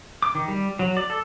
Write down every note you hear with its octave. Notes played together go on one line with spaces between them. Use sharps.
D6
D#3
G3
F#3
D5
A4